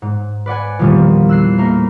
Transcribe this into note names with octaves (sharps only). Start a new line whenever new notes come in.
G#2
B4 D5 F#5 G#5
E2 A#2 D#3 F3 G3
E6 F#6 C7
A3 A#3 A#4